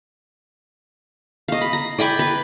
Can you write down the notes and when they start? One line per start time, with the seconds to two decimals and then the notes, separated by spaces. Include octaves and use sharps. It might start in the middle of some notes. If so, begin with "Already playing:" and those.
1.48 D#5 F5
1.61 B5
1.73 A#5
1.99 D5 G5 G#5 B5
2.19 B4